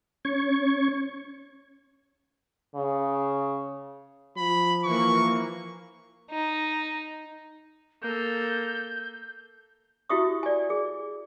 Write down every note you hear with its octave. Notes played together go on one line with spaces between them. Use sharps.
C#4 C#6 G#6
C#3
F3 B5
E3 A#3 C#6
D#4
A#3 A4 G6
E4 F#4 G4 E5 C#6 D#6
D5 G#5
G#4